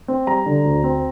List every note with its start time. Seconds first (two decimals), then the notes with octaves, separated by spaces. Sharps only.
0.08 C4
0.27 G3 A#5
0.46 D3
0.65 D2
0.84 C4